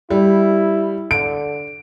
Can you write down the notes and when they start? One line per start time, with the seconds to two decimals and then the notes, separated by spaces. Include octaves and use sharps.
0.10 G3 E4
1.11 D3 D7